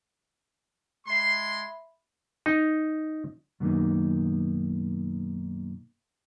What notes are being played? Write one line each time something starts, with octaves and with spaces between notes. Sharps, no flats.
G#3 E5 B5 C6
D#4
F#2 B2 D#3 A3 A#3 D#4